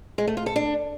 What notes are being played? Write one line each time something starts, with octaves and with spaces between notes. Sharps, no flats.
G#3
A3
F4
A4
D4